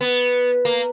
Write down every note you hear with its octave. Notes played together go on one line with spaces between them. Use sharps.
B3
A#3